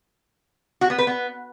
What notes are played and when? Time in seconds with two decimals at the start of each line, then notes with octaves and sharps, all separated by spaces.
0.81 F#4
0.90 B3
0.98 B4
1.07 B3